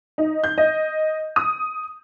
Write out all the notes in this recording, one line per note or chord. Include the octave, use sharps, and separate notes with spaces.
D#4
G6
D#5
D#6